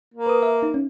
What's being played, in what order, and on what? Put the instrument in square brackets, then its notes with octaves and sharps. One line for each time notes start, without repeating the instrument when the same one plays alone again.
[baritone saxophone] A#3
[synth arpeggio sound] B4 D#6
E5
D#4
C#4